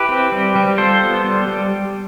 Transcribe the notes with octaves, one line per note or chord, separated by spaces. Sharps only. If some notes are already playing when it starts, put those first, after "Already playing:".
Already playing: E4 G4 B4
C4
G3
G3
F4 A4 C5
B3
G3
G3